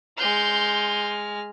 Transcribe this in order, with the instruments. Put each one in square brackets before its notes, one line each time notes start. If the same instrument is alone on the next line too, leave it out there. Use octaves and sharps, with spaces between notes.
[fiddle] G#3 F6 [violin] C6 G6